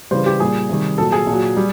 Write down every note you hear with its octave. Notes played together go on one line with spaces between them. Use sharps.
C#3 E3 G3 C5
G4
A#2 G3 G#4
C3 D#3 G3
A#2 F#3 A4
G#4
A#2
F#3
G3